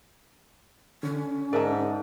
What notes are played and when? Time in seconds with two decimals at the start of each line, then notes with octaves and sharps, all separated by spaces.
1.03 D3 C#4 D4
1.53 G#2 A#4 D5 E5 A5 D#6